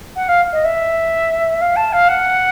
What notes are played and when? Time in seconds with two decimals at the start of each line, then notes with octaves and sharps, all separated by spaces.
0.16 F#5
0.28 F5
0.53 D#5
0.64 E5
1.61 F5
1.76 A5
1.93 F5
2.08 F#5